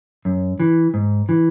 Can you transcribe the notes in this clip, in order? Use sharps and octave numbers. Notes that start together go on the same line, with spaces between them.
F#2
E3
G#2
E3